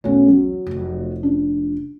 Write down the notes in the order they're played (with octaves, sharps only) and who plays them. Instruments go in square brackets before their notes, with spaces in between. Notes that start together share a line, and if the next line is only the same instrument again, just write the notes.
[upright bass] B1 E2 [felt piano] B2 A3 C#4
[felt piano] F#3
[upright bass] F1 F2
[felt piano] D4